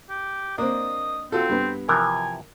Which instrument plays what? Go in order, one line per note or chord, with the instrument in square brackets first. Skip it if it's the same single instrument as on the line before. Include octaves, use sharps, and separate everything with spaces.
[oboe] G4
[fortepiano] A#3 C4 [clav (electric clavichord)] D4 [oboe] D#5
[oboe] C4 [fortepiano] F4 F#4 A4
[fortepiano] G2 B3
[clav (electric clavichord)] C3 E3 F3 [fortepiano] A#4 [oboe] G#5